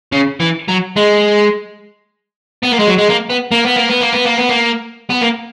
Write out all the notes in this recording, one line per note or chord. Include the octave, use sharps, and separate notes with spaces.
C#3
E3
F#3
G#3
B3
A#3
G#3
F#3
G#3
A#3
B3
A#3
B3
A#3
B3
A#3
B3
A#3
B3
A#3
B3
A#3